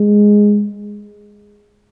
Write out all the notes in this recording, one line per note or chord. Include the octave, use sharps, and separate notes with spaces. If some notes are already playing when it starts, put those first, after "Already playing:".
Already playing: G#3